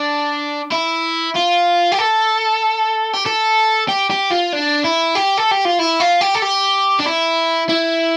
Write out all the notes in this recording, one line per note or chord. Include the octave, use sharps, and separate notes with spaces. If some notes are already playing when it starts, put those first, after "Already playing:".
Already playing: D4
E4
F4
G4
A4
G4
A4
G4
G4
F4
D4
E4
G4
A4
G4
F4
E4
F4
G4
A4
G4
D4
E4
E4